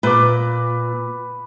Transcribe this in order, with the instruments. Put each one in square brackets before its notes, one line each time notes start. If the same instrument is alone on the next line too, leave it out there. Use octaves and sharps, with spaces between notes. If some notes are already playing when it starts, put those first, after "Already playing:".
[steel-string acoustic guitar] A#2 [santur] B4 D6